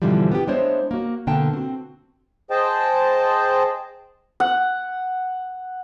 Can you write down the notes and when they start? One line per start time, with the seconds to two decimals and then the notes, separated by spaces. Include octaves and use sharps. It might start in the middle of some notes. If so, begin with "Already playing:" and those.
0.02 G#2 B2 D3 E3 F3 G3
0.32 B3 G4
0.48 G#3 B3 D4 E4 C5 C#5
0.91 A#3 F#4
1.27 B2 D3 A#3 G5 A5
1.53 C4 F#4
2.51 G#4 C5 D#5 G5 A5
4.40 F#5